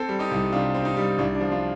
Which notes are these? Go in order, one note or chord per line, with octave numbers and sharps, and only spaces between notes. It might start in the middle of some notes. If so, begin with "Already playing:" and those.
Already playing: C4 A4 C5
G3
D#4 G4
C2
C3 D4 F4
C4
D#4
G3
C2 D4 F4
D4
F3
D4 F4